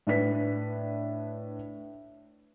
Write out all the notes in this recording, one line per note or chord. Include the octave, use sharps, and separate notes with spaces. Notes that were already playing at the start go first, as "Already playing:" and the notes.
A2 D4 B4 B6